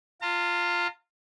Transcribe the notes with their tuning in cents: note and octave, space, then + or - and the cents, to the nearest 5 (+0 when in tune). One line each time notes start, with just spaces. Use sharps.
F4 +0 A#5 -45